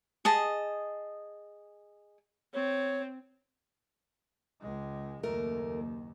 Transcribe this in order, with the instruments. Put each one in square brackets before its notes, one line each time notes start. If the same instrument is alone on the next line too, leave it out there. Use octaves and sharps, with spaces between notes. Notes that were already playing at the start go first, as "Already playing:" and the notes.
[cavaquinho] G#4 D#5 A5
[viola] C4 [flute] C#5
[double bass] C#2 G#3
[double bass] F#1 D#2 [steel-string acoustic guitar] A3 A#4